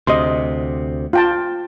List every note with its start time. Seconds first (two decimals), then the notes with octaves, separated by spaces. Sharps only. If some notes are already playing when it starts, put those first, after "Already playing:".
0.07 D2 C3 D#5 C6
1.13 F4 G5 A5